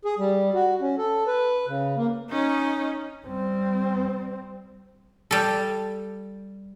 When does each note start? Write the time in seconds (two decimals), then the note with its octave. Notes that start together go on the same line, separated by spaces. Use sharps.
0.05 G#4
0.19 G3
0.54 F#4
0.81 C#4
0.98 A4
1.27 B4
1.67 C#3
1.97 A#3
2.29 C#4 D#4
3.27 G3 C4
5.31 G3 A4